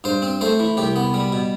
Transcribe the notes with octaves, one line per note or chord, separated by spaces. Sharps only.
G2 C5
C4
A3 C5
E3
C2 G4
B3
G3
B2